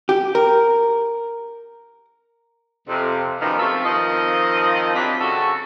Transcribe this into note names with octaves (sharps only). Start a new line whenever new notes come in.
G4
A#4
F2 C3
F#2 D#3 F3 G3 B3 F5
C3 F3 A3 F4 F#4 A4
D#3 F3 C4 D#5
F#3 C4 D4 E4 F4 G4
C#3 F#4 A4